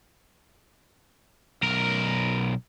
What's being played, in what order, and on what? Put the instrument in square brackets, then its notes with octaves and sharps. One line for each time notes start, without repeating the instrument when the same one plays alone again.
[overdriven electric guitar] B1 A#4